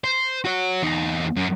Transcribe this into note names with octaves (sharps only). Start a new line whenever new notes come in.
C5
F#4 C#5
E2 D#4
F#2